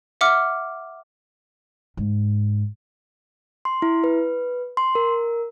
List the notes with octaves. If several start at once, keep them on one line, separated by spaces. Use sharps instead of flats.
E5 F#5 D6 F6
G#2
C6
E4
B4
C6
A#4